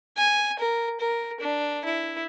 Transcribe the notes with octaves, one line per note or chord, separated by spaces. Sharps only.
G#5
A#4
A#4
D4
E4